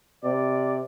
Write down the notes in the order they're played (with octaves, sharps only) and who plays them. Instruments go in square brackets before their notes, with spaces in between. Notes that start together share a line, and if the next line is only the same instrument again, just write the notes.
[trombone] C3 [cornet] D5